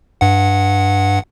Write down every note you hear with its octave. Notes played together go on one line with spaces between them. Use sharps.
G2 F#5